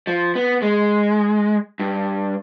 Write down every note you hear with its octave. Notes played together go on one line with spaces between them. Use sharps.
F3
B3
G#3
G2